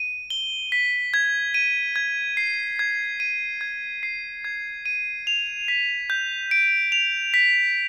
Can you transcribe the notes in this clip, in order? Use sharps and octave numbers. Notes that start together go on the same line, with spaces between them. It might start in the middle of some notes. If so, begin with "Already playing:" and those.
Already playing: D#7
G7
B6
G#6
D#7
G#6
C7
G#6
D#7
G#6
C7
G#6
D#7
F7
B6
G6
D7
F7
B6